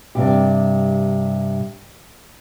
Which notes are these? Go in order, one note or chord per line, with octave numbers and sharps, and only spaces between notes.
G2 C3 G4